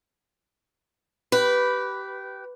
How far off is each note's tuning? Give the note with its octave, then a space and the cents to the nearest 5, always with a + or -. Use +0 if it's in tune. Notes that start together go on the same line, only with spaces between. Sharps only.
G4 -20 B4 +0